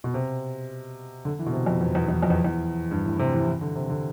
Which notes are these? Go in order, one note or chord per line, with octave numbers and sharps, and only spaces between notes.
B2
C3
D3
E3
B2
C3
F2
E2
E2
E2
F2
E2
E2
G2
A2
C3
E3
E3
D3
C3
D3